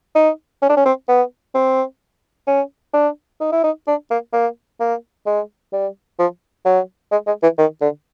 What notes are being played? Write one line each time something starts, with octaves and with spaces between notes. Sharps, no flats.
D#4
C#4
D4
C#4
C4
B3
C4
C#4
D4
D#4
E4
D#4
D4
A#3
A#3
A#3
G#3
G3
F3
F#3
G#3
G#3
E3
D#3
D3